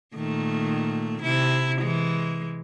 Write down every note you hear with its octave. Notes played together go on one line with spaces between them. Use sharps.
A#2 D#3 A3
C3 E4
E3 G#3